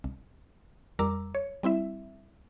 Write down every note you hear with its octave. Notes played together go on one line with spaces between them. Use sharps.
C2
F2 G3 A#4 A#5 D6 E6
C#5
G3 C4 E4 E5